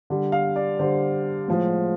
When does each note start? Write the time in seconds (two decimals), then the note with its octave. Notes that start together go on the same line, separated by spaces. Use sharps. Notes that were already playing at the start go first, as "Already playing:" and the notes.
0.10 D3 G3
0.32 F5
0.56 D5
0.79 D3 G3 C5
1.48 A2 F3 G#3